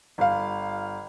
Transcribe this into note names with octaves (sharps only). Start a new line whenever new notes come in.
G1 F5